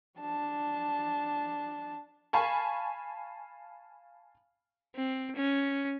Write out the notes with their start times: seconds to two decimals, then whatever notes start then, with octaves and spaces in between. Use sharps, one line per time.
0.19 D4 A5
2.33 F5 G#5 A5 B5 C#6
4.95 C4
5.36 C#4